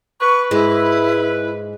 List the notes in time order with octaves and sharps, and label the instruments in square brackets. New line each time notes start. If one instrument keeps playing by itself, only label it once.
[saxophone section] B4 [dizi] C#6
[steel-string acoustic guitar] G#2 G#3 [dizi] E4